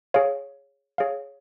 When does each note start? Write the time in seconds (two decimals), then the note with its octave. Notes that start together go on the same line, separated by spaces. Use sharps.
0.14 G#4 C#5 F5
0.98 G#4 C#5 F5